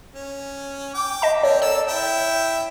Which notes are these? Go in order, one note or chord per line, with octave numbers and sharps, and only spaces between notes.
C#4
G5 D6
D#5 A5
C4 A#4 C#5
A4 C#5 E6
E4 E5 G5